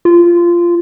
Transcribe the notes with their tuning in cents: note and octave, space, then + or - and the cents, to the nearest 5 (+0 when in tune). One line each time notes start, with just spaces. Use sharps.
F4 -15